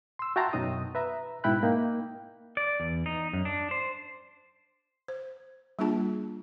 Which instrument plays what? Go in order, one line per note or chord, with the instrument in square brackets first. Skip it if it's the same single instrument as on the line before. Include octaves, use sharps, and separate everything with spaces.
[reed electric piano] C6 E6
F#4 E5 G5 A5 A#5 C6
F#2 B2 F#3 D#4 D#6
B4 E5 A#5
G#2 B2 E4 G5 B5 F#6
A#3 D#4 G5
[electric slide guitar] D5
E2
D#4
F#2
D4
C5
[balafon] C5
G3 A#3 D4 F4 G#4 A5